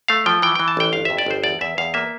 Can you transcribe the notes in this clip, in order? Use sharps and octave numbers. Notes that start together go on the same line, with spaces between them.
A3 F5
F3 G5
E3 G5
E3 G5
A5
A1 G5
G1 F5
F2 E5
D5
G1 C5
E2 D5
E2 E5
E2 F5
A#3 E5